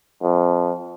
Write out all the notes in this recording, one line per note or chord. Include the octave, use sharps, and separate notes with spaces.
F2